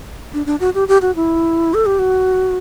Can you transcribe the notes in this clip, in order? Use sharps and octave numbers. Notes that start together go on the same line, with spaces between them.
D4
D4
F#4
G4
G4
F#4
E4
A4
G4
F#4